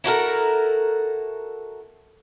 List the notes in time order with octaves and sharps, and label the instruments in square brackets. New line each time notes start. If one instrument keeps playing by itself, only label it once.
[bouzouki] E4 F#4 A4 A#4